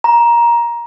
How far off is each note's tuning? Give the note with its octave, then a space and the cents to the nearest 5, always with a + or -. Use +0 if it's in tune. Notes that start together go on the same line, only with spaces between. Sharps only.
A#5 +15